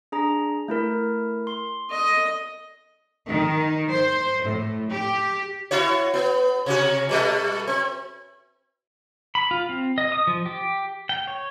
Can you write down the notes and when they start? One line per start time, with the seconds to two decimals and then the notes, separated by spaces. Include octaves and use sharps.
0.12 D4 G#4 A#5
0.68 A3 E4 A#4
1.47 C6
1.90 D#5
3.28 D#3
3.90 C5
4.43 A2
4.90 G4
5.71 E4 F#4 C#5
6.14 B3
6.66 C3 C#4 F#4
7.09 B2 G3 A3
7.67 C4
9.35 B5
9.51 F4
9.69 C4
9.98 D#5
10.12 D#6
10.27 F3
10.46 G4
11.09 G5
11.27 C#5